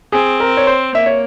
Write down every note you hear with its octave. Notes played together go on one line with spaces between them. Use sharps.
C4 G#4
A#4
C#5
C5
A#3 E5
C#5